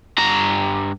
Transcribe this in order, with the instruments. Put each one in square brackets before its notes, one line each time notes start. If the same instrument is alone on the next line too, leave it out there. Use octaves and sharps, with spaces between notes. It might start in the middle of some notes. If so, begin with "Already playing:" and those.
[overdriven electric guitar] G2 A#5